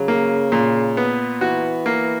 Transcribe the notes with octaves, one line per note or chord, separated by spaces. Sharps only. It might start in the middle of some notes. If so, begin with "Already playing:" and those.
Already playing: C#3 F#3
A#3
A#2
B3
E3 F#4
A#3